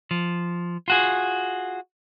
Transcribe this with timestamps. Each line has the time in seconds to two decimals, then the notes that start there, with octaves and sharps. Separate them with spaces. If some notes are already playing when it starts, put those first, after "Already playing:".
0.11 F3
0.88 F4 F#4 G#4